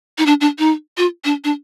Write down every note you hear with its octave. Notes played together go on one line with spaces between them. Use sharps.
D#4
D4
D4
D#4
F4
D4
D4